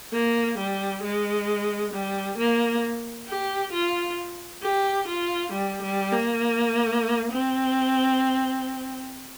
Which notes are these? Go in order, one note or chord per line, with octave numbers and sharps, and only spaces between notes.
A#3
G3
G#3
G3
A#3
G4
F4
G4
F4
G3
G3
A#3
C4